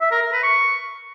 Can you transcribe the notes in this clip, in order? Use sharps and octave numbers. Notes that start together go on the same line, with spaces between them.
E5
A#4
A#4
B4
C#6